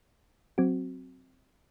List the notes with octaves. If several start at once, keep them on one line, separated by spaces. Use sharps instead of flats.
F#3 C4 F#4